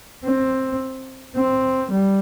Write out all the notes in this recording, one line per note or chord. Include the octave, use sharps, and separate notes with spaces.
C4
C4
G3